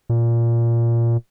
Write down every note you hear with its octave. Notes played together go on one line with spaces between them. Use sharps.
A#2